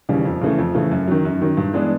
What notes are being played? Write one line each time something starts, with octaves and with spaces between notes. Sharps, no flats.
D#2 C#3 E3 G3
F2
C#3 E3 A3
F2
C#3 E3 A3
F#2
D#3 F#3
F#2
D#3 F#3
G2
E3 G#3 B3 D4